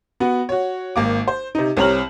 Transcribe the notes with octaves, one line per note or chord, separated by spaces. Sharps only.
B3 F#4
F#4 C#5
G#1 A#3 D6
C5
C3 D#4
C2 C4 C#5 A#5 F6 F#7